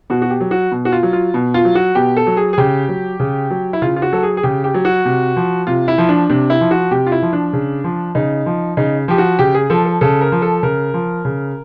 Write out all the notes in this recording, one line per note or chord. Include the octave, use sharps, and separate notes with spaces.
B2 F#4
F#4
G4
F#3
F#4
B2
F#4
F4
F#3
F4
B2
F4
F#3
F#4
B2 G4
A4
F#3
G#4
G#4
C#3 G4
F#3
C#3
F#3
E4
C#3 F4
F4
F#4
F#3 A4
G#4
G#4
C#3 G4
G4
F#3
F#4
C3
F3
C3 F4
E4
F3
D4
C3 D4
E4
F3
F#4
C3 G4
F4
E4
F3
D4
C#3
F3
C#3 D#4
F3
C#3 D#4
F3 G4
F#4
C#3 G4
G#4
F3 A4
A4
C#3 A4
A#4
F3
A4
C#3 A#4
F3
C#3